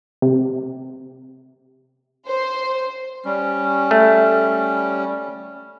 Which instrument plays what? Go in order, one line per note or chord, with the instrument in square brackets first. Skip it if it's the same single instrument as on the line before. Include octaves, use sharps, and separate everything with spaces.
[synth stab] C3
[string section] C5
[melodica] G3 C#4
[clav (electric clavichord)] A3